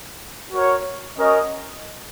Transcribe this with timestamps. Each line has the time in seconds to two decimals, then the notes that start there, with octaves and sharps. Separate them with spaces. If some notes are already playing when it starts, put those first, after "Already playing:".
0.52 F#4 A#4 C#5
1.17 C#4 F#4 A#4 D#5